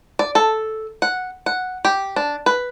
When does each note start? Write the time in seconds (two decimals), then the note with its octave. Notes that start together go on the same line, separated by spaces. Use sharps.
0.19 D5
0.35 A4
1.02 F#5
1.46 F#5
1.85 G4
2.16 D4
2.46 B4